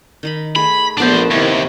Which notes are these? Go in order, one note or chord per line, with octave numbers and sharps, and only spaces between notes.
D#3 D#4 B5
A3 G#4 B5
A#1 A3 B3 D4 C5 A5
D#2 C3 D#3 E4 G#5